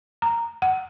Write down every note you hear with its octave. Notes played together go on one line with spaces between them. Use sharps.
A#5
F#5